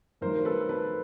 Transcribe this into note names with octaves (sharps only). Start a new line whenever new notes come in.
G2 D#3 F#3 A3 A#4 C5
A4 B4
A4 B4